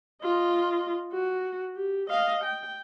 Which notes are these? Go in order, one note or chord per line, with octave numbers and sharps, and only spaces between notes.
F4 D#5
F#4
G4
D#5 F5
G5